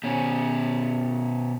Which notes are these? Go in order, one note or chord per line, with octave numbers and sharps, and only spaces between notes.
B2 C#4